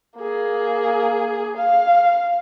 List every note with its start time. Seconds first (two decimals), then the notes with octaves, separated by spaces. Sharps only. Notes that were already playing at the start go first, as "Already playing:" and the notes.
0.18 A#3 G#4
1.57 F5